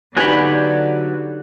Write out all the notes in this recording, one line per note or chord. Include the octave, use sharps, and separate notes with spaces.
D3 F#3 B3 D#4 F#4 G4 G#5 B5